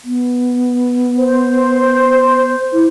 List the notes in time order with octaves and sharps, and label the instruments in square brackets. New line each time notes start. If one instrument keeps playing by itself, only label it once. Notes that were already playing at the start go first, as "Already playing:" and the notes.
[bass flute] B3
[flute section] C5
[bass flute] E4